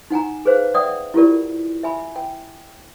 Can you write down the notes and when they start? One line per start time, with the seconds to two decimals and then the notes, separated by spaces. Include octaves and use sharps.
0.10 D#4 F#5 G#5 A#5
0.45 G#4 B4 C5 F5
0.74 D5 E5 F#5 G5 D#6
1.14 E4 F4 G4 A#4 D5
1.83 E5 G#5 B5
2.16 G5